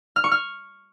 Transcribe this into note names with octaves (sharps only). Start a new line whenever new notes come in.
F6
C#6
F6